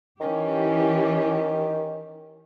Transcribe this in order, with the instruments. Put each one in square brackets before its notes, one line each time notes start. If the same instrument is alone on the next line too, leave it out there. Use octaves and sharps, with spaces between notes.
[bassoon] D#3 [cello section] E3 G4 [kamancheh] C#4